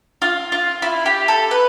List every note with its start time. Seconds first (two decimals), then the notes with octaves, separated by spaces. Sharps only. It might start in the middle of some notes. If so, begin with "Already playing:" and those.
0.22 F4
0.52 F4
0.82 E4
1.06 G4
1.28 A4
1.51 B4